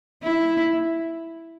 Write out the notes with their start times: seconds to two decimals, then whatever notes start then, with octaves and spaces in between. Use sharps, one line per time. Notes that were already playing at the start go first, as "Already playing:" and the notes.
0.23 E4